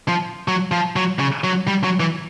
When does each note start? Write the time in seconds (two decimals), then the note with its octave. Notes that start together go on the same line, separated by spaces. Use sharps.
0.08 F3
0.48 F#3
0.72 F3
0.96 F#3
1.19 C#3
1.44 F#3
1.68 G3
1.84 F#3
2.00 E3